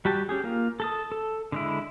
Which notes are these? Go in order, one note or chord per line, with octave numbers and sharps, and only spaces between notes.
G3 F#4 G4 A5
C#4 G4 G#4
A#3 F4
A4 A5 D#6
A4
D3 G#3 E4